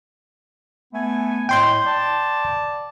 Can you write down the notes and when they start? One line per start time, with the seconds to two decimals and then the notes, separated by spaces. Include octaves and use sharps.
0.94 A3 B3 G#5
1.49 A2 G#3 G5 C6 G6
1.86 D5 A5